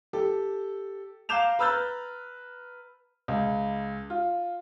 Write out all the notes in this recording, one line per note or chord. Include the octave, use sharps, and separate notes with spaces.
G4 A4
F5 A#5 D6 G6 E7 F7
B4 A#5 E6 F6 G6 A6
C#2
F4